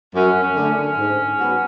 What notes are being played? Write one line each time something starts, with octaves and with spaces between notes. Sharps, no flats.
F#2 C#4
C#4
D3 A3
C#4
G#2
F#3 B3 F#4